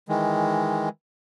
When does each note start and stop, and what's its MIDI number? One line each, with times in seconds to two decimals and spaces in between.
0.09 0.89 51
0.09 0.89 52
0.09 0.89 56